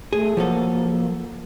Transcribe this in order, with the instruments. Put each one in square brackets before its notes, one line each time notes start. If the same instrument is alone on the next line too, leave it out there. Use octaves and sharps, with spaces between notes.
[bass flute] A3 [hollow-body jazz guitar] G#4
[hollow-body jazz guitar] F3 F#3 A4 [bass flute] A#3